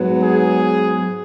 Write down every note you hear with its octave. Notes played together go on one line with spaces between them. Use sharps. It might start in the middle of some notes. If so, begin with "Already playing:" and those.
Already playing: G#2 F#3 B3
G#4